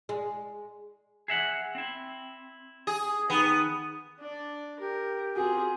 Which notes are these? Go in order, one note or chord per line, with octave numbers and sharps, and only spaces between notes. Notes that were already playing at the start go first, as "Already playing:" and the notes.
G#3
G#4 E5 F#5
C4 E4
G#4
D#3 B3
D4 D5
G4 A#4
C4 F4 F#4 G#4